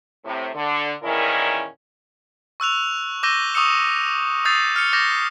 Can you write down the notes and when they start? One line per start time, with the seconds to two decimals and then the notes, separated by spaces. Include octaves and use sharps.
0.25 A2 C3
0.54 D3
1.03 E2 A#2 D#3 C#4 E4 A#4
2.60 C#6 E6 F#6 F7
3.23 D6 E6 G6 A#6 D#7 G7
3.54 C#6 D#6 E6 C#7 E7
4.45 D#6 E6 G6 A6 C7
4.76 F6 C#7
4.93 D6 G6 A6 A#6